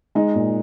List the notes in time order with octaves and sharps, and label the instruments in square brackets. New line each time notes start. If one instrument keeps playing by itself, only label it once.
[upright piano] G#3 D#4
A#2